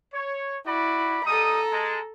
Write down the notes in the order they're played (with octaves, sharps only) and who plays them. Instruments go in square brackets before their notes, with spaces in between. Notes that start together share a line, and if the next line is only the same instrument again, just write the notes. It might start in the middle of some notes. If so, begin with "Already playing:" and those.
[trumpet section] C#5
[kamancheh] E4 [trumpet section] F#4 D5 B5
[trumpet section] G3 D#4 D#6 [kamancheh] A4 A#5
[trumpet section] G#3 A5